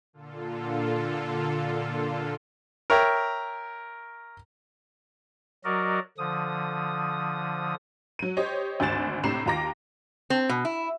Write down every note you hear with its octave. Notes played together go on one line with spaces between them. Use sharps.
A#2 D3 F4 A4
A#4 C#5 E5 G5
F#3 F#4 A#4 D5 D#5
D3 F3 D#6
F#3 D#7
G4 C5 C#5 D#5
G#1 D2 G#5 A6 E7
A2 C3 D4 A#5 C7 E7
D#2 F4 A#5 D6 A#6
C4
B2
E4